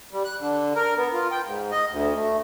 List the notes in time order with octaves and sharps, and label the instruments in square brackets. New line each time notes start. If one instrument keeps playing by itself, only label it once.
[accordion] G3
F#6
D3
A#4
B3
F4
G5
G#2
D#5
D2
A3